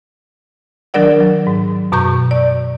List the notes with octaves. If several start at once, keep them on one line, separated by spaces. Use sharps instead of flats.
D#3 F#3 D4 A#4 D5 F#5
F#3
G#2
F#2 B2 A#5 C#6 G6
D5